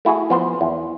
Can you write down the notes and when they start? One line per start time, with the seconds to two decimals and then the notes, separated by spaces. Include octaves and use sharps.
0.05 A3 E4 F#4 G#4
0.30 F3 B3 C5
0.61 E2